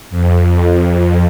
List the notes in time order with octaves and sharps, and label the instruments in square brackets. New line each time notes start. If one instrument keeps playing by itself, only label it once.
[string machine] F2